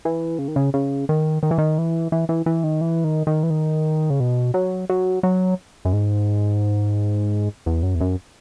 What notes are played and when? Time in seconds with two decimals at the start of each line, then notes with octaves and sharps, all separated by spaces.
0.05 E3
0.39 C#3
0.48 D#3
0.56 C#3
0.74 C#3
1.09 D#3
1.43 D#3
1.51 E3
1.58 D#3
1.78 E3
2.12 E3
2.29 E3
2.46 E3
2.64 D#3
2.81 E3
3.04 D#3
3.27 D#3
3.43 E3
3.50 D#3
4.10 C#3
4.20 B2
4.54 F#3
4.90 F#3
5.23 F#3
5.85 F#2
5.93 G#2
7.66 E2
7.83 F#2
7.95 E2
8.01 F#2